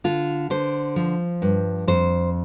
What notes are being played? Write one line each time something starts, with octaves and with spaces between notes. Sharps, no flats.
D3 F4
D3 C5
F3
G2
F2 C5